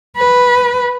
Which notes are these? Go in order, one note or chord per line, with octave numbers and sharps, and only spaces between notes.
B4